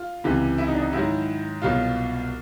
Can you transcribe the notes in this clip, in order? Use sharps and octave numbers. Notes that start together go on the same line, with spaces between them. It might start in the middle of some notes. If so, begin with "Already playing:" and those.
Already playing: F4
C#2 C3 E3
E4
D#4
D4
D#4
G#2 D#3 F#3 E4
C2 B2 F#3 F4